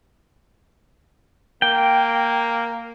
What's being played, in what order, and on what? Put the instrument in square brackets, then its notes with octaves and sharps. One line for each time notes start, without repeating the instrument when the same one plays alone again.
[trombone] A#3 [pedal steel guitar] G5